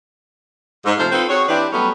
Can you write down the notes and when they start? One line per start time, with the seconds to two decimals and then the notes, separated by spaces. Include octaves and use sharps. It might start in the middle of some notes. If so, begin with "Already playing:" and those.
0.85 G#2
0.98 C3 F3 A3 C5 F5
1.12 C4 D#4 F4 A4 B4 C5
1.29 C4 F#4 G#4 C#5
1.48 E3 C4 D4 E4 G4 B4
1.73 F#3 G3 A3 B3 C#4